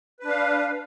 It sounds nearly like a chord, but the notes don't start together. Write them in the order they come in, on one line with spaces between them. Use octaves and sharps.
B4 D4 F5